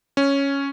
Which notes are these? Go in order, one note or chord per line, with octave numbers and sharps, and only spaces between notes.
C#4